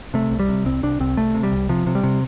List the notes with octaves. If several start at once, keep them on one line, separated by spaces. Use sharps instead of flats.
C3 A3
C2
G3
C3
C2 C4
C2 D4
C2 C4
C2 A3
C3
G3
C2
C3 F3
C3
G3
C3